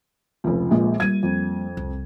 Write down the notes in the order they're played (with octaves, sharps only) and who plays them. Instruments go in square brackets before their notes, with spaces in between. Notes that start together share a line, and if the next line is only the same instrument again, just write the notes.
[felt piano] F1 C#2
A#1 A#2 G#3
[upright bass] G3 A#3 [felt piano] G#6 D#7
[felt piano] F2
[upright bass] C2